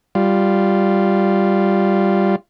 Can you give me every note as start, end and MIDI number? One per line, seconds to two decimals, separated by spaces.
0.15 2.36 55
0.15 2.36 65